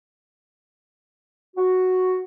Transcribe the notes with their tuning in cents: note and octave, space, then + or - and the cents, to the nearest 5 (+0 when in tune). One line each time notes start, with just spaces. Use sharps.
F#4 +0